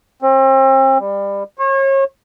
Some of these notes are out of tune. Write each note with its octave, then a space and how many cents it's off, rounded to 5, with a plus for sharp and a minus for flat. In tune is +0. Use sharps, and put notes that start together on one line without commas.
C4 +40
G3 +25
C#5 -35